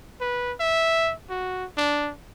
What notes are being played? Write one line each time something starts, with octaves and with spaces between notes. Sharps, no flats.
B4
E5
F#4
D4